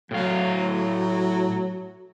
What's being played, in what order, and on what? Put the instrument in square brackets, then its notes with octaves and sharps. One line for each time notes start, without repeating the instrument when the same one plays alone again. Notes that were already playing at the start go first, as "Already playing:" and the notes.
[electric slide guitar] A2 F5 [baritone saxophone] F#3